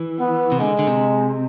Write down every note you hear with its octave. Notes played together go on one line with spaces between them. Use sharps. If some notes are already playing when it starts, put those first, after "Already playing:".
Already playing: E3
B3
C3
D3 G#3
D3
C3